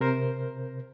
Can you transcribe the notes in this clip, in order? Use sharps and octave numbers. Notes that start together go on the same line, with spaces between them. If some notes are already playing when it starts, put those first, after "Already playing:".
C3 A#4 C5